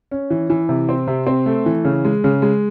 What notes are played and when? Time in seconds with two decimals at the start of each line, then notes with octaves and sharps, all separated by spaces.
0.11 C#4
0.30 E3
0.50 E3
0.69 C3
0.89 C4
1.07 C3
1.27 C4
1.46 A3
1.66 E3
1.85 C#3
2.05 G#3
2.24 C#3
2.42 G#3